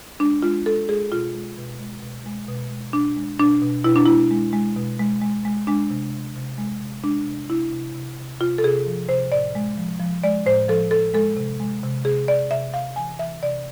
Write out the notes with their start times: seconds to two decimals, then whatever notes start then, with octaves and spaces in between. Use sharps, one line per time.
0.20 G#3 D4
0.43 G#3 F4
0.66 G#3 A4
0.89 G#3 G#4
1.12 B2 F4
1.35 G#3
1.58 B2
1.79 G#3
2.02 B2
2.26 G#3
2.48 B2
2.71 G#3
2.93 B2 D4
3.16 G#3
3.39 B2 D4
3.62 B2
3.84 B2 E4
3.96 D4
4.06 G#3 E4
4.31 G#3
4.53 G#3
4.77 B2
5.00 G#3
5.22 G#3
5.45 G#3
5.67 G#3 D4
5.90 C3
6.13 C3
6.36 C3
6.58 G#3
6.82 C3
7.03 G#3 D4
7.26 C3
7.50 C3 E4
7.72 C3
7.95 C3
8.19 C3
8.40 C3 F4
8.58 A4
8.63 C3 G#4
8.86 F3
9.09 C3 C5
9.32 A2 D5
9.55 G#3
9.77 F3
10.00 F3
10.24 G#3 D5
10.46 A2 C5
10.68 F3 A4
10.91 F3 A4
11.14 G#3 A4
11.37 C3
11.60 G#3
11.83 C3
12.05 C3 G#4
12.28 C3 D5
12.51 C3 E5
12.74 C3 F5
12.96 E3 G#5
13.19 E3 E5
13.42 C3 D5